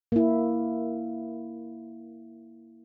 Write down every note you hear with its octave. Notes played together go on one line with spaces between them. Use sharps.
A#3 E4